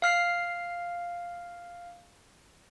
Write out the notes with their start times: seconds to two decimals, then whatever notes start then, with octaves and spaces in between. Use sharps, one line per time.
0.02 F5 F6 C7